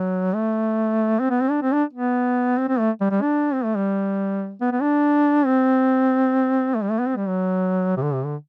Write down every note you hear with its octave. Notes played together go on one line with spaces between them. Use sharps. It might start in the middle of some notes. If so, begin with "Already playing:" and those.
Already playing: F#3
A3
C4
B3
C4
D4
C4
D4
B3
C4
C4
A3
G3
G3
D4
C4
A3
G3
B3
B3
D4
C4
A3
G3
A3
B3
C4
G3
F#3
C3
D3
C3
D3